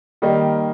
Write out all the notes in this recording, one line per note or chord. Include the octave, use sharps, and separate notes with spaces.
D#3 G3 A#3 D#4